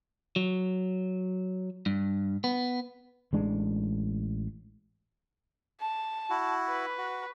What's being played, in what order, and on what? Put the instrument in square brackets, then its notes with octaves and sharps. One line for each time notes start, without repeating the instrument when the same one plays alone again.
[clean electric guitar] F#3
G2
B3
[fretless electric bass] A1 G#3 D4
[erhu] A5
[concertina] E4 F#4
[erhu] B4
[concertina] F#4